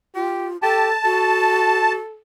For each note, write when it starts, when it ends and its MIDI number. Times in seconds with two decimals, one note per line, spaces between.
0.15 0.57 65
0.15 0.48 67
0.62 0.88 67
0.62 0.91 69
0.62 1.92 81
1.04 1.94 66
1.04 2.18 69